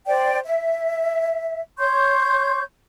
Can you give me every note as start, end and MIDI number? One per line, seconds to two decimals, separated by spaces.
0.07 0.39 72
0.07 0.39 74
0.07 0.39 79
0.45 1.60 76
1.78 2.61 73
1.78 2.61 84
1.78 2.61 85
1.78 2.61 91